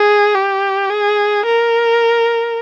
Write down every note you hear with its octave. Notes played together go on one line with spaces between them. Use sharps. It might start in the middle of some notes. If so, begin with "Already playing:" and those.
Already playing: G#4
G4
G#4
A#4